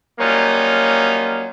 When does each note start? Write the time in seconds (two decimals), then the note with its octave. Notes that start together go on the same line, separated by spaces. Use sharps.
0.20 F#3 G3 A#3 C#4 D#4 F4